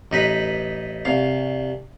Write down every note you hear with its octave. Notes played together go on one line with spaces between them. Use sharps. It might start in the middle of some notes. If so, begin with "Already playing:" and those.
A1 D#4 B4 B5
C2 F5